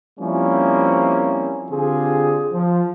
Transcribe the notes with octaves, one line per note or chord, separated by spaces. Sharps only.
F3 G3 A#3 C4 C#4 E4
D3 C4 F4 G4 G#4
F3